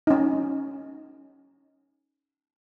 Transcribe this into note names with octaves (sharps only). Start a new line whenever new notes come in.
C#4 D#4